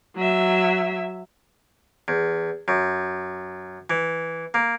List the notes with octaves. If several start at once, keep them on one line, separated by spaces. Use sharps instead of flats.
F#3 E5
E2
F#2
E3
A#3